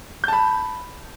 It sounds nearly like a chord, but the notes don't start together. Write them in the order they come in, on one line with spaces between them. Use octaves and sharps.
G6 A5 B5